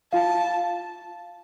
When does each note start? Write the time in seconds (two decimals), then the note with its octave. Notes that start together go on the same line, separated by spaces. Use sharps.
0.13 F4 F5 A5